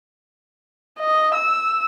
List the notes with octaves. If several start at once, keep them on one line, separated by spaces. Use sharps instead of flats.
D#5
E6